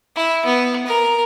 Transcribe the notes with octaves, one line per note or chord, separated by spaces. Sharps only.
E4
B3
A#4